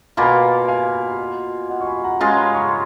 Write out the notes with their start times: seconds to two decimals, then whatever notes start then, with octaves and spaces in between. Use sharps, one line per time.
0.17 B2 A#3 F4 G#5 B5
0.68 F5 G#5
1.70 D#5 F#5
1.81 C#6
1.86 G#5 B5
2.04 F#5 A#5
2.20 G#3 C#4 F4 F#5 A#5
2.37 G#5 B5
2.54 A#5 C#6